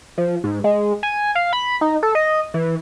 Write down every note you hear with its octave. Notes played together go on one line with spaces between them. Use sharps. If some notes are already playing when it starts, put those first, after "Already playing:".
F3
G#2
G#3
G#5
F5
B5
D#4
A4
D#5
E3